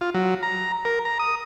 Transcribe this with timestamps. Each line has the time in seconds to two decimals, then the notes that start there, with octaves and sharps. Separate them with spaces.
0.01 F4
0.14 F#3
0.43 A#5
0.85 A#4
1.05 A#5
1.19 D#6